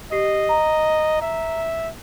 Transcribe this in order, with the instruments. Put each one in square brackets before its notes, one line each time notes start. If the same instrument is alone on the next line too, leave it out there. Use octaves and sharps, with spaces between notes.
[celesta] G4 C7 [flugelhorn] D#5
[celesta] A#5
[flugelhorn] E5